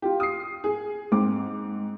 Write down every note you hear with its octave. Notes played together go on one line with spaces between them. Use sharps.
F4 G4
D#6 C7
G#4
G#2 C4 D6